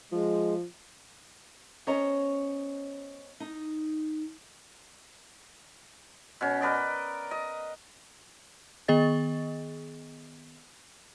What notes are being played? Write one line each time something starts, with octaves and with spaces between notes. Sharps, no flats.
F3 G#3
B3 C#4 C5 C#5 D#5 A#5
D#4
B2 C#4
A#4 B4 D5 D#5
D#5
D#3 B3 G#4 D#5 A6